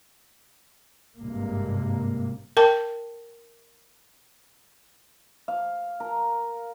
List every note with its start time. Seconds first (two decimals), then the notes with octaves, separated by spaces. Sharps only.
1.19 G#1 G2 C3 A#3
2.57 A#4 G5 A5
5.48 F5
6.00 A#4